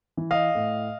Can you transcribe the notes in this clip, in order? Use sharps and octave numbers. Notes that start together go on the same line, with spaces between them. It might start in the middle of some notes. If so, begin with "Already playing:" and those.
E3
D#5 F5
A2